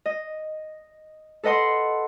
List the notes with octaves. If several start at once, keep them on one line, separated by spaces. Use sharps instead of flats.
D#5
A4 B4 D#5 F#5 C6